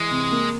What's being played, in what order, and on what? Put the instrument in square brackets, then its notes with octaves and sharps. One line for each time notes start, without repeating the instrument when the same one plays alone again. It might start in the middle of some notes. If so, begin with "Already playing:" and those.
Already playing: [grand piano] E3 [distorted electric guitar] G#3
[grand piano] C3
A#3